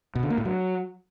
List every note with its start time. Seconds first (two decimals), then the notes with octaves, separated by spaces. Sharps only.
0.15 B2
0.23 D3
0.30 A#3
0.38 A2
0.45 F#3